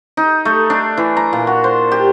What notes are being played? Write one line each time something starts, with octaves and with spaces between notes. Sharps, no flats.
D#4
A3
D4
E3
A#5
A#2
F#4
C5
G4